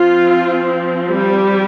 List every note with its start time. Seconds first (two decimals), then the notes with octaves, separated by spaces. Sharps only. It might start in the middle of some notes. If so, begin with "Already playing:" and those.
Already playing: F3 C4 F4
1.09 G3 G4